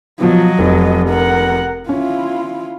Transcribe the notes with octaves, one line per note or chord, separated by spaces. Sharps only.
B2 F3 F#3 D#5
F1
A#4 F#5
C#4 E4 F4